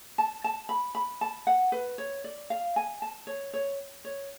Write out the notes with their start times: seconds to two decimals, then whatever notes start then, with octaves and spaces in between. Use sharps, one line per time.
0.18 A5
0.44 A5
0.69 B5
0.95 B5
1.21 A5
1.47 F#5
1.72 B4
1.98 C#5
2.24 D5
2.50 F5
2.76 G#5
3.02 A5
3.27 C#5
3.54 C#5
4.05 C#5